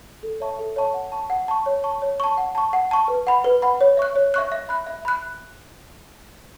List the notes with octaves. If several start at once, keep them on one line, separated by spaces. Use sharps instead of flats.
A4
C#5 E5 A5 C#6
A4
C#5 E5 A5 C#6
F#5
A5 C#6
F#5
A5 C#6
C#5
A5 C#6
C#5
A5 C#6
F#5
A5 C#6
F#5
A5 C#6
B4
F#5 B5
B4
F#5 B5
C#5
E5 C#6 F#6
C#5
E5 C#6 F#6
E5
B5 F#6
E5
B5 F#6